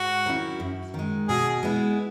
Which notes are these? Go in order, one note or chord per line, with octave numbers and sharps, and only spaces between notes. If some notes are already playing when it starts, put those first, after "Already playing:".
Already playing: G#2 F#4
D#3 F#3 C#4 E4
F#2
D#3 G#3
B2 G#4
G#3 B3 E4